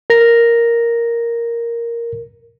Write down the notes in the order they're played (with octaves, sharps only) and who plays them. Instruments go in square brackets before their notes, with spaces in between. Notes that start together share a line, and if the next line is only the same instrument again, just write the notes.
[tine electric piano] A#4 A#6